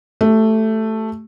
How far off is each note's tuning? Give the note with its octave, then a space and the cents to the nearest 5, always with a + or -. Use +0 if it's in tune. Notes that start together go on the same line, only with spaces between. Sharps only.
A3 +0 G4 -20